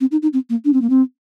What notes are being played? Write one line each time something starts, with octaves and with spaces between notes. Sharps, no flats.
C4
D#4
D#4
C4
A#3
D4
C4
A#3
C4